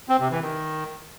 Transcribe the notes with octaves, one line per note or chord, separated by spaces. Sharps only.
C4
C3
E3
D#3